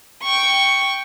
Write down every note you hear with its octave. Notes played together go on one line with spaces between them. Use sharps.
G5 C#6